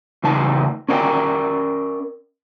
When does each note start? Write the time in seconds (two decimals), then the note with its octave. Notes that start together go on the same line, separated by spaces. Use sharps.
0.24 E2 A2 C#3 D#4 A5
0.89 C#4 D4 A#4 C#5 D5 G5